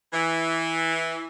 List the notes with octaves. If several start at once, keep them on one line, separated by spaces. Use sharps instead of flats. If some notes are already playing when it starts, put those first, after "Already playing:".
E3